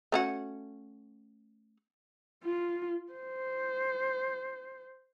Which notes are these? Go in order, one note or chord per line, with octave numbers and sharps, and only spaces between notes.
A3 C#4 F#4
F4
C5